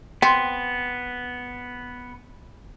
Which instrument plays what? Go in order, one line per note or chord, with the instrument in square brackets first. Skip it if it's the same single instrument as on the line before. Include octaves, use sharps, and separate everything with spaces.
[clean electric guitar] B3 [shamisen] C4